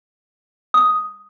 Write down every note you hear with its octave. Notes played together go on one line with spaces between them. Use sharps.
D#6